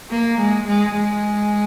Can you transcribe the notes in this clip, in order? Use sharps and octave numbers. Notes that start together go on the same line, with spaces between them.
A#3
G#3
G#3
G#3